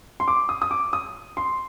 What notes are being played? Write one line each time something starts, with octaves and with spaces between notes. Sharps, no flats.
C6
D6
D#6
D#6
D6
D#6
C6